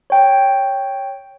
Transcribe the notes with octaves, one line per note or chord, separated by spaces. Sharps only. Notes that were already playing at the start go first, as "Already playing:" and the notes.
C#5 G5